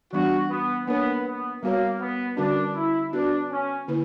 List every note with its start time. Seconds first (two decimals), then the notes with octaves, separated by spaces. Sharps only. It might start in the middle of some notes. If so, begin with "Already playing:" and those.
0.12 E3 G3 B3 D4 F#4
0.50 B3
0.87 A#3 B3 D4 A#4 C#5
1.25 B3
1.63 G3 A#3 B3 F#4 A#4 C#5
2.00 B3
2.37 D3 G3 C#4 D4 F#4 A#4
2.75 E4
3.13 B3 D4 F#4 B4
3.50 C#4
3.88 D3 A#3 E4 B4